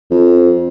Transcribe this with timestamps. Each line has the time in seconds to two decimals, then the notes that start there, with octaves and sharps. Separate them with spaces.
0.11 F2